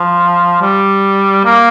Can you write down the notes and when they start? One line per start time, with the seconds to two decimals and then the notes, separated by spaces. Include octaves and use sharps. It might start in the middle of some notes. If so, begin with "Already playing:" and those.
Already playing: F3
0.61 G3
1.45 A#3